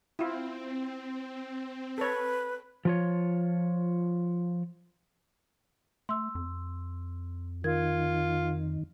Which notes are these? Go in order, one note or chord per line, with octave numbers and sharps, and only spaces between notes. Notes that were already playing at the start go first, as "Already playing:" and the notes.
C4 E4 F4
A4 B4 C#5
F3 F4 C#5
A3 C6 E6
F2
D#3 F4 A#4 G#6